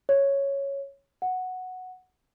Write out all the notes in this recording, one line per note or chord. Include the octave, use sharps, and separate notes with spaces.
C#5
F#5